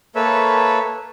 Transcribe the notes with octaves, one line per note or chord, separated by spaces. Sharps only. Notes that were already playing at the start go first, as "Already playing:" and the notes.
A#3 A4 B4 C#5 E5